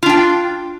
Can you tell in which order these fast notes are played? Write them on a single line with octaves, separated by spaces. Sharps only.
F4 D4 G5